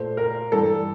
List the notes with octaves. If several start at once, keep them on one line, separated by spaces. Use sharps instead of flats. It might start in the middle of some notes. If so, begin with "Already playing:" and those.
Already playing: A#2 A3 C5
A#4
G2 E3 G3 A4